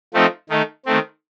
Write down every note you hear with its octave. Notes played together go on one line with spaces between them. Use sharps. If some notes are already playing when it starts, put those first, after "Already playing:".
F3 A3 C4 D#4 A4
D#3 A3 D#4
D#3 A3 C4